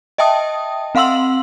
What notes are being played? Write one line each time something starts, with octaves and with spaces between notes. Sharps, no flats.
D#5 E5 G5 A5 D#6
C4 F5 F#5 C6 E6 F#7